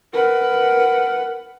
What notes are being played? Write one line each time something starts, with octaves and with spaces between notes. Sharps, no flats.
A#4 B4 F#5